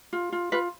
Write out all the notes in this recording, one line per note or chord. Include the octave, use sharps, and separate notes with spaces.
F4
F4
F4 B4